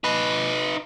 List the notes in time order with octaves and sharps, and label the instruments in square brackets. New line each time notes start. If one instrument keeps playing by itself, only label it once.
[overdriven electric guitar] D#4 B4